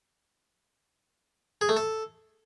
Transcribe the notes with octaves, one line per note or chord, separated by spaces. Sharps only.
G#4
A3
A4